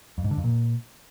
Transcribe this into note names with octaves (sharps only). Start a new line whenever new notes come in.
F2
G#2
D3
F2
A#2